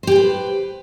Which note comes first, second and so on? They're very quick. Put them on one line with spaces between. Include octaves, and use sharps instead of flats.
C5 G4 G#4 B4